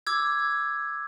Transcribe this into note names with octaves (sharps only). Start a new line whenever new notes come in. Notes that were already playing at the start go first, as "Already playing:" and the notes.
D6 E6 G#6